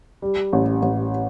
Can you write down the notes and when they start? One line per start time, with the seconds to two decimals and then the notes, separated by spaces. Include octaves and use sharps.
0.22 G3
0.53 A1
0.82 A1